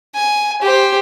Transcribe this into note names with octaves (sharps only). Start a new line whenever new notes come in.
G#5
G4 C5